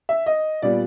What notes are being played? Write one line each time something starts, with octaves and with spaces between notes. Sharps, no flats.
E5
D#5
A#2 G3 B3 D5